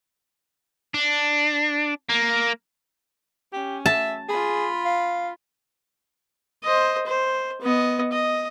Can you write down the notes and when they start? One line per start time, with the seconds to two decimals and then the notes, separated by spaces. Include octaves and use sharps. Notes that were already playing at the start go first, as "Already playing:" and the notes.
0.94 D4
2.09 A#3
3.53 C#4 G4
3.86 E5 A5
4.29 F4 G#4 B5
4.85 F5
6.64 C5 D#5
7.06 C5
7.62 B3 D#5
8.13 D#5